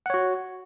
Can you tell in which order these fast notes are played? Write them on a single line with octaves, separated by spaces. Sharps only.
F#5 C#5 F#4